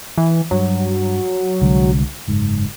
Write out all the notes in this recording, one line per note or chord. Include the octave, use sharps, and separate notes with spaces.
E3
G2 F#3
C2 D3 G#3
F#1 G#2